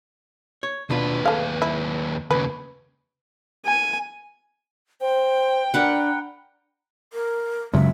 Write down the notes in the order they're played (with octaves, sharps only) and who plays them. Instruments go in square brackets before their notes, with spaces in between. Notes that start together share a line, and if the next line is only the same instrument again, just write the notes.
[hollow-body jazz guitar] C#5
[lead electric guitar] D#2 B4 [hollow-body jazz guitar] B2 D4 F4
[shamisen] A3 F5 [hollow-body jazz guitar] G#4
[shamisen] E4
[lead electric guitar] D#2 C#3 [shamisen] B4
[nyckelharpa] G#5
[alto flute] C5 [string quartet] G5
[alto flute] D4 [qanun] A#4 B4 F#5
[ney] A#4
[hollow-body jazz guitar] C#2 [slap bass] F#2 C#3 F#3 [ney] E5